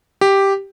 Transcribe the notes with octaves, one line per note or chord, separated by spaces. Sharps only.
G4